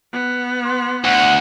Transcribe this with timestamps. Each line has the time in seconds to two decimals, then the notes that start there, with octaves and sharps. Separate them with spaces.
0.12 B3
0.65 C6
1.04 D2 F#5